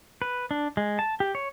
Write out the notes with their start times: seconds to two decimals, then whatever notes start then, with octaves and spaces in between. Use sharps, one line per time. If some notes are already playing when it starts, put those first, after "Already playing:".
0.22 B4
0.51 D4
0.77 G#3
0.99 A5
1.20 G4
1.35 C#5